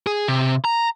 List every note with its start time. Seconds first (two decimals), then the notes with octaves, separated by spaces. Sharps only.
0.07 G#4
0.28 C3
0.65 A#5